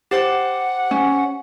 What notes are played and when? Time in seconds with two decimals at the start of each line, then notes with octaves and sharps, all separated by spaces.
0.11 G4 C5 F#5 D6
0.91 C#4